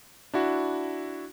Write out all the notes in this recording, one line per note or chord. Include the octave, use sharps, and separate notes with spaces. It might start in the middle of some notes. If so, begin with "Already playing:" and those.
D4 E4 F#4